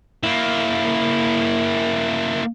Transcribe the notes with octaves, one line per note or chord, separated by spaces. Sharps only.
A#3 E4